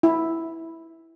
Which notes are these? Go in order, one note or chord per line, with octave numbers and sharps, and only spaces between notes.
E4